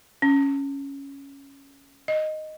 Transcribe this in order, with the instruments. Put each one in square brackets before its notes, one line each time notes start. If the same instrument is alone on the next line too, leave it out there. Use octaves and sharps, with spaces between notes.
[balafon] C#4
D#5